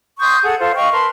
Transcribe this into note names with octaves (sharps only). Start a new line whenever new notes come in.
C6 C#6 D#6 G6
G#4 A4 F#5
F4 A4 C5
D#5 F5 G5 C#6
A#4 B4 A5 C6